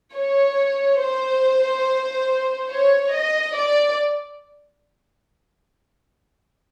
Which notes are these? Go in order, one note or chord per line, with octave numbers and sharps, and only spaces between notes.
C#5
C5
C#5
D#5
D5